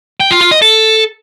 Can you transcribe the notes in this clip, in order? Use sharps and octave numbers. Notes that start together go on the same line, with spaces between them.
G5
F4
F4
D#5
A4